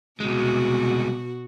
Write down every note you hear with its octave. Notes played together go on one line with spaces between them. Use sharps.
C2 B2 G#3 F#4